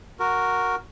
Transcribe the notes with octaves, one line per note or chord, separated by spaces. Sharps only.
F#4 A#4